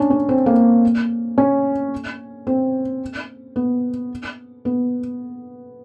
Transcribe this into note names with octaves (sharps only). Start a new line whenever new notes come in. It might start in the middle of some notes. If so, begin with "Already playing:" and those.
Already playing: C#4 D4
C#4
C4
A#3
C#4
C4
B3
B3